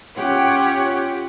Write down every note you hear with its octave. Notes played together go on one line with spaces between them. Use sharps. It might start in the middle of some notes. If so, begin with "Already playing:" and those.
C#4 F4 G4 C#5 F#5 G5